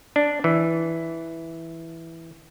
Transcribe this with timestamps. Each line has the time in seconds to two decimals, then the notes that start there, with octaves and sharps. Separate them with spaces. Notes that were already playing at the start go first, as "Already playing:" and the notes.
0.16 D4
0.44 E3